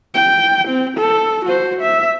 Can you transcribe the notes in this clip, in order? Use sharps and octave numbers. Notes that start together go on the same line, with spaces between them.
G5
C4
A4
F#4 C5
E5